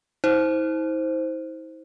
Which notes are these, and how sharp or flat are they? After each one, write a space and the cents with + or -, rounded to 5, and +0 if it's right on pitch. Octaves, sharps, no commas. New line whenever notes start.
E4 -45 C5 +0